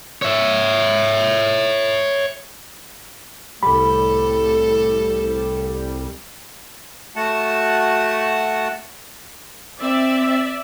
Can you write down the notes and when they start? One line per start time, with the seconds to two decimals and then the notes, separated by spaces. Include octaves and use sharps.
0.22 C#5 E5
3.63 C2 A2 G3 A4 B5
7.16 A3 F#4 F#5 A5
9.79 C4 D5 E5